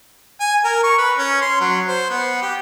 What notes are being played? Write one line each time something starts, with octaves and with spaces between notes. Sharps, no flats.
G#5
A#4
C#6
B4
C#4
C6
F#3
C5
B3
G4